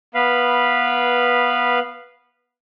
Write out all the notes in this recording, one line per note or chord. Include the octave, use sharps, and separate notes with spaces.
B3 B4 F5 B5